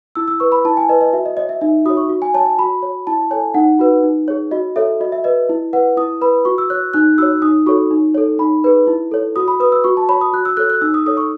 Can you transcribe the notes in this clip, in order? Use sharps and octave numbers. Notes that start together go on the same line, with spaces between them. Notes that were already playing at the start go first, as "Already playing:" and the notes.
E4 E6
E6
B4 C#6
B5
E4 A5
G#5
B4 D#5
D#5
F#4 E5
D#5
C#5 D#5
E5
D#4 E5
F#4 C#5 D#6
C#6
F#4
G#5
C#5 A5
A5
F#4 B5
C#5
E4 A5
A4 C#5 G#5
D#4 F#5
F#4 B4
D#4
G#4 C#5
F#4 D#5
A4 C#5 E5
F#4 D#5
E5
B4 D#5
E4
B4 F#5
E4 D#6
B4 B5
F#4 C#6
E6
C#5 F#6
D#4 F#6
F#4 C#5 E6
D#4 D#6
F#4 A4 C#5 C#6
D#4
A4 C#5
D#4 B5
G#4 B4
E4
A4 C#5
F#4 D#6
B5
B4 D#6
E6
F#4 C#6
A5
C#5 B5
D#6
F#4 F#6
E6
A4 C#5 F#6
F#6
D#4 E6
D#6
A4 C#5 D#6
C#6